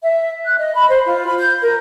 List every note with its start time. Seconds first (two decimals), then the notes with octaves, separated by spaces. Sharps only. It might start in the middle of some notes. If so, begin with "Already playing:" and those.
0.03 E5
0.45 F#6
0.59 D#5
0.75 B5
0.89 C5
1.05 F4
1.26 B5
1.39 G6
1.62 A#4